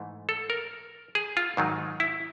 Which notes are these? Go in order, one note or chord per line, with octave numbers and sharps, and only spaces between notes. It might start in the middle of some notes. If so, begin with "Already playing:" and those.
Already playing: G#2 E3 A3
A4
A#4
G#4
F4
G#2 D#3 F#3
E4